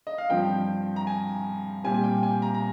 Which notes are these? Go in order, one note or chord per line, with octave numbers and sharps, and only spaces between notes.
D#5
F5
G2 F3 C4 G5
A#5
G#5
A#2 G3 C4 G#5
G#5
G5
G#5
A#5
A#5